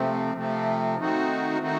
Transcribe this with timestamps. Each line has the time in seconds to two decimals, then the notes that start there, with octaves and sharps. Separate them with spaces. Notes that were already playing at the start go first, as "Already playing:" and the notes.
Already playing: C3 F3 A3 C4
0.35 C3 F3 A3 C4
0.96 D#3 A3 C4 D#4 F#4
1.59 D#3 A3 C4 D#4 F#4